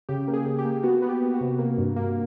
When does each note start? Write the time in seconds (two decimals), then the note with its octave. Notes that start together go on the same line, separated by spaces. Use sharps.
0.09 C#3 G4
0.28 A#3
0.33 G#4
0.46 C#3
0.59 G4
0.65 A#3
0.83 B3 F#4
1.02 B3
1.09 G4
1.22 B3
1.34 F#4
1.41 C3
1.59 A#3
1.78 G2
1.96 A#3